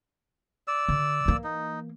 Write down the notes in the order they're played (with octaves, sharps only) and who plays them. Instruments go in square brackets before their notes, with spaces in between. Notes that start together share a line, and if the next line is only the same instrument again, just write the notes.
[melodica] D5 E6
[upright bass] D3
E3 A#3
[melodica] D#4